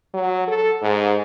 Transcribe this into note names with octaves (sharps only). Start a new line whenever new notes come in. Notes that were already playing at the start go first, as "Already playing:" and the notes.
F#3
A4
G#2